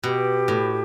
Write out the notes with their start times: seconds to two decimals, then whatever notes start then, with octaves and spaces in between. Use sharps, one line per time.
0.03 B2 G4
0.48 A2